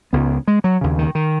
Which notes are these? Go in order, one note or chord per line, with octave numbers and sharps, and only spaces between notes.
C#2 C#3 B3
G#3
F#3
D#2 C#3
D#3
D#3